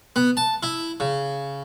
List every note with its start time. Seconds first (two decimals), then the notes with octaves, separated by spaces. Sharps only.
0.16 B3
0.37 A5
0.63 E4
1.00 C#3